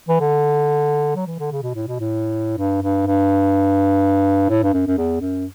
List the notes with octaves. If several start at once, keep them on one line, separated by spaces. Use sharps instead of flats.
E3
D3
F#3
E3
D3
C#3
B2
A2
B2
A2
G2
G2
G2
A2
G2
F#2
F#2
E2
F#2